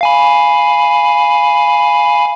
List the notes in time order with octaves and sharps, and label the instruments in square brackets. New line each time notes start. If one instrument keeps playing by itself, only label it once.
[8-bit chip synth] F5 G#5 B5